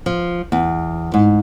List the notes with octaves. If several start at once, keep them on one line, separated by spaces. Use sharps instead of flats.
F3
E2
G#2